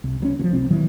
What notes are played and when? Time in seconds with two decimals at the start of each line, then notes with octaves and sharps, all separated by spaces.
0.04 C2
0.20 C#2 F#3 C#4
0.39 D2 F3
0.53 F1 C2 C4
0.70 A#2 D#3 E3 F#3